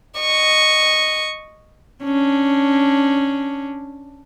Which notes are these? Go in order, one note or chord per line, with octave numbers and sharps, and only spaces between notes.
D#5 C#6
C#4 D4